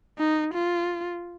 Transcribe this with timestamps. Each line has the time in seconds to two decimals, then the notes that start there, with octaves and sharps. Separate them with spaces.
0.19 D#4
0.54 F4